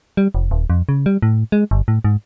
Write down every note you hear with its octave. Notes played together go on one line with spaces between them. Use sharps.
G3
F1
D#1
F2
C#3
G3
A2
G#3
G1
A2
G#2